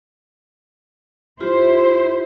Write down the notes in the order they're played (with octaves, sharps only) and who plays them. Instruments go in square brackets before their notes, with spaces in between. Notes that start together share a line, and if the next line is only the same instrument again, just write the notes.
[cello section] E4 C5 [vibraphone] F4 G4 C6